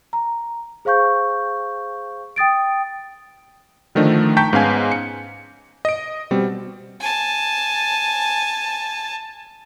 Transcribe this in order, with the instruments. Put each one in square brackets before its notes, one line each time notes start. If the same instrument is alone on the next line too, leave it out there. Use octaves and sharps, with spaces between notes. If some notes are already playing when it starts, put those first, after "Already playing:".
[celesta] A#5
G#4 C5 F5 C#6 G6
G5 D#6 A6 D7
[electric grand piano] D3 D#3 F3 A3 D4 D#4
G5 A5 A#5 C#6 G6 B6
G#2 B3 C#4 F5 G#5 G#6
C#7
D#5 D7
B2 G3 C4
[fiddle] G#5 A5